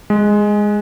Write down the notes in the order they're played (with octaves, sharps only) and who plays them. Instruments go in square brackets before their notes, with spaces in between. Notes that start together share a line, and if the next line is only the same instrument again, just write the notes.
[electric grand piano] G#3